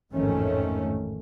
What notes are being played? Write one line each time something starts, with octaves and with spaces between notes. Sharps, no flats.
A1 F2 G#2 D#3 A3 C#4